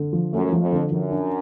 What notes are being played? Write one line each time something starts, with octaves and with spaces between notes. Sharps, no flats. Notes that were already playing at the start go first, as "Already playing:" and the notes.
Already playing: D3
F3
F#2 A3
F3
F2
D3
F#2 F3
D4